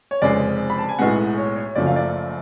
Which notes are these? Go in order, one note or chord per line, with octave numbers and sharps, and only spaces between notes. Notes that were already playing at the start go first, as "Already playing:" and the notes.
C#5
F1 F2 C#3 G#3 D5
B5
A5
G#5
B1 A2 G#3 B3 F#5
C#5
C#5
F#1 F#2 F3 A3 D5
F5
D5